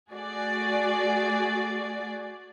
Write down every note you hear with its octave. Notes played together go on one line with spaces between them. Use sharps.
A3 F#4 G#4 D5